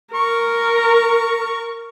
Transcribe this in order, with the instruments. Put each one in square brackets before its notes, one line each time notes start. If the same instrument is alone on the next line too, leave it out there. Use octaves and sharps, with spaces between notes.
[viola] A#4 [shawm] C#6